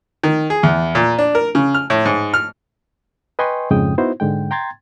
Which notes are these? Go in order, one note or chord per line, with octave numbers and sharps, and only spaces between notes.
D#3
G#4
E2
A#2
D4
A#4
C#3
F6
A2
G#2
F6
B4 D#5 G5 G#5 C6 C#6
F2 G#2 C#3 G#3 G5 D#6
B3 D#4 E4 F#4 C5
G#2 D3 G#3 G5
G5 A#5 C6 G#6 A6